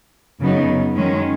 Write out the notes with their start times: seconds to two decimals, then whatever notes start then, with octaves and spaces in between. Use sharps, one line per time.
0.40 F#2 C#3 F#3 B3 D#4
0.97 F#2 D#3 G#3 C#4